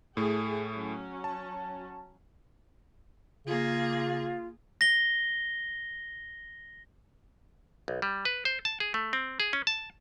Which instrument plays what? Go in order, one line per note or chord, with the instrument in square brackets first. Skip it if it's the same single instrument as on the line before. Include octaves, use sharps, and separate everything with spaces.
[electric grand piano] A2 A3 [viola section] G#4
[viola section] F#3 C#4
[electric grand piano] A5
[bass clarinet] C#3 [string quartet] A#3 G#4 [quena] F4
[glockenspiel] A#6 G7
[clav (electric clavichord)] B1
G3
B4
C5
A5
G#4
A3
C4
G#4
C#4
A5